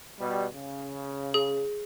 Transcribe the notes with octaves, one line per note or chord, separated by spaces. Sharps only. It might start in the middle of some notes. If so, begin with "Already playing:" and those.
B2 G3
C#3
G#4